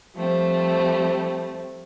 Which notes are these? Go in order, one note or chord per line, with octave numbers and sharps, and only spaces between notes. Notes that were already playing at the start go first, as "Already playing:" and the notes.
F3 G3 A3 C4